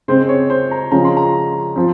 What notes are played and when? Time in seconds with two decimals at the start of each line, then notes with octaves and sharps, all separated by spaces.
0.08 C#3 G#3 C4 C5
0.23 C5
0.29 C#5
0.50 C5
0.71 A#5
0.92 C#3 F3 G#3 C#4 F4 A#5
1.05 C6
1.17 A#5
1.76 F3 C4